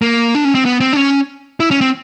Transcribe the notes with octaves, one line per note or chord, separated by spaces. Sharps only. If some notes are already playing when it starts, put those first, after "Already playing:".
A#3
D4
C#4
C4
B3
C4
D4
C#4
E4
C#4
C4